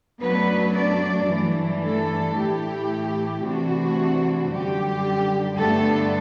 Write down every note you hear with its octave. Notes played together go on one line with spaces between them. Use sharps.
F#2 F#3 A3 B3 D4 B4
D4 D5
G2 E3 A3 D4
A3 A4
A2 E3 A3 E4 G4
C3 E3 A3 D4 F#4
F#2 D3 G3 G4
G2 D3 G3 A3 B3 D4 A4